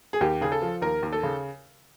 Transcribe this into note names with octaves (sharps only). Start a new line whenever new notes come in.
G#4
D#2 G4
C#3 G#4
A4
F3
D#2 A#4
D#2
A4
C#3